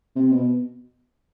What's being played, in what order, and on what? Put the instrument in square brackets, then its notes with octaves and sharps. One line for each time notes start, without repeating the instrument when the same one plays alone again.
[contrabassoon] C3
B2